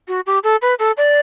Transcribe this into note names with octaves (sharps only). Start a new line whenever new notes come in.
F#4
G4
A4
B4
A4
D5